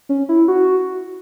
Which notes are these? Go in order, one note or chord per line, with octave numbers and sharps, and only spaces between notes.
C#4
E4
F#4